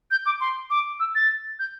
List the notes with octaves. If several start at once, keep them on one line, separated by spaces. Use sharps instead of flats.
G6
D6
C6
D6
E6
A6
G6